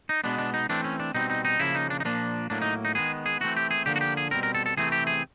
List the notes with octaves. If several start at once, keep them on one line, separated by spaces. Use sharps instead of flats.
D#4
B2 G#3 B3 D4
D4
D#4
E3 A3 C4 D4
C#4
D4
B2 G3 C4 D#4
D#4
D#4
C#3 F3 A#3 E4
D#4
D4
D#4
A#2 F3 A#3 D4
A2 F#3 A#3 D4
D#4
D#4
D#3 G#3 B3 G#4
G#4
E3 A3 C4 F#4
G4
G#4
D3 F3 A#3 G4
F#4
G4
G#4
B2 G3 C4 A#4
A#4
A4
A4
C3 E3 A3 C4 G#4
G4
G#4